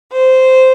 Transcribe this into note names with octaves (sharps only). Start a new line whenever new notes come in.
C5